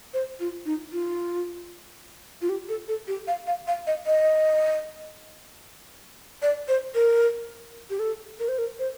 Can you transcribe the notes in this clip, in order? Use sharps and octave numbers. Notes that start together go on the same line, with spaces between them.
C5
F4
D#4
F4
F4
G4
A4
A4
G4
F5
F5
F5
D#5
D#5
D5
C5
A#4
G4
A4
A#4
C5
A#4
C5